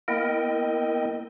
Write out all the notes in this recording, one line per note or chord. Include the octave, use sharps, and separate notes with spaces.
A#3 B3 E4 A#4 D#5 G5